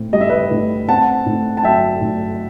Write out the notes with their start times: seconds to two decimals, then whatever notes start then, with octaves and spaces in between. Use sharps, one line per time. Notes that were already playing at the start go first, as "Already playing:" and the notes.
Already playing: A2 C4
0.13 G3 D#5
0.21 E5
0.30 B4 D#5
0.51 A2
0.89 C4 F#5 A5
1.26 A2
1.57 A5
1.63 F#3 E5 G5
2.01 A2